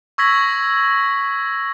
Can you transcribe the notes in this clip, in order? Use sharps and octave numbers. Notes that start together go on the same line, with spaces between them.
C#6 E6 G#6 A#6 B6 F#7